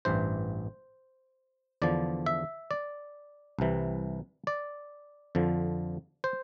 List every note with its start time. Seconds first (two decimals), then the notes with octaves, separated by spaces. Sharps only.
0.05 A1 G2 E3 C5
1.82 E2 D3 F3 D5
2.26 E5
2.71 D5
3.59 C2 C3 E3
4.47 D5
5.35 F2 D3 F3
6.24 C5